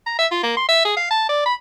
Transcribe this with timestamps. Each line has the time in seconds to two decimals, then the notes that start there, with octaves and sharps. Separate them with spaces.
0.07 A#5
0.19 E5
0.31 F4
0.43 A#3
0.57 C6
0.69 E5
0.85 G#4
0.97 F5
1.11 A5
1.29 D5
1.46 B5